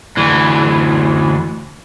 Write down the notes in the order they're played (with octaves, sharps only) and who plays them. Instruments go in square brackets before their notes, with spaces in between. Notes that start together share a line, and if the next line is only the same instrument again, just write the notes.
[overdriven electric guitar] D2 E3